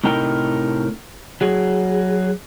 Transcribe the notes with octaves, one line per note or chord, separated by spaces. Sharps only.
A2 C3 D#4 A#4 G5
F#3 G#4